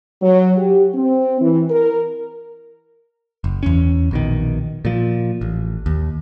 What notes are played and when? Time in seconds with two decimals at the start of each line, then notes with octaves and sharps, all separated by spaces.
0.22 F#3
0.58 G4
0.95 C4
1.41 E3
1.71 A#4
3.44 F#1
3.63 E2 C#4
4.11 A#1 B2 D#3
4.85 A#2 F3
5.41 A1
5.86 D#2